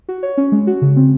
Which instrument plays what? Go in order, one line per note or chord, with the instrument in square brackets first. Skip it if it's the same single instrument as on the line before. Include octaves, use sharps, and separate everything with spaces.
[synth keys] F#4
C#5
C#4
G#3
F#4
C#3
C4